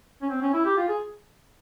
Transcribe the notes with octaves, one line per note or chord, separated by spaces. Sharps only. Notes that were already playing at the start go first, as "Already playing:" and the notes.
C#4
C4
C#4
E4
G4
F4
G#4